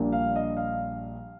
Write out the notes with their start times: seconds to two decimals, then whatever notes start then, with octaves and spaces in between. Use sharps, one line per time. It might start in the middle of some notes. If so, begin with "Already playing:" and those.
Already playing: A#1 A#2 G3 A#3 D4
0.13 F5
0.36 D#5
0.57 F5